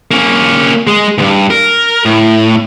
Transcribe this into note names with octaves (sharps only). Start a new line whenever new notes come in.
A#3 C#4
G#3
D2 G2
A#4
A2